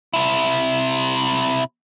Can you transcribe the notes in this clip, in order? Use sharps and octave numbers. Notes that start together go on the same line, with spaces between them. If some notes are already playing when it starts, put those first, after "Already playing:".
C3 E4